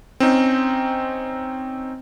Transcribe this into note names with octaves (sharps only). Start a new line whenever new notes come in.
C4 C#4 D#4